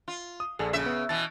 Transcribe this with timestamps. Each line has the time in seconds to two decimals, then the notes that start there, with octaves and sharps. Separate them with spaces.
0.08 F4
0.40 D#6
0.59 A#1 A#2 G#4 A4
0.73 C#3 E5
0.86 B3
1.09 B2 E3 A6